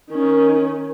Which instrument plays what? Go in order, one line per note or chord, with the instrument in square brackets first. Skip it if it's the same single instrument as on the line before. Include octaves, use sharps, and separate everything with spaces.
[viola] D#3 C#4